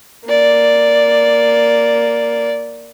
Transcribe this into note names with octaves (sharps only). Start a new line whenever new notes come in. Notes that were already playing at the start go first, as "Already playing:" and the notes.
A#3 D5